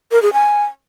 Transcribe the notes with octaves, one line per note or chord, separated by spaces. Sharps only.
A#4
G#4
G#5